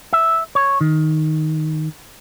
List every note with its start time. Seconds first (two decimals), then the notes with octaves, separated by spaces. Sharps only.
0.13 E5
0.55 C#5
0.81 D#3